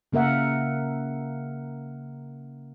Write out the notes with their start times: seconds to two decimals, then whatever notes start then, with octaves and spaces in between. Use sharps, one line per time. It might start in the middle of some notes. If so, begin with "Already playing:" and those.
0.12 C#3 A#3 A#4 E5 F#5